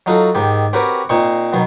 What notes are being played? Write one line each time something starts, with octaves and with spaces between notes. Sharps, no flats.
F#3 D#4 F4 F#4 A4
G#2 D#3 G4
C4 F#4 G4 A#4 B4 C#5
A#2 C4 D#4 C#6
B2 D#3 F#3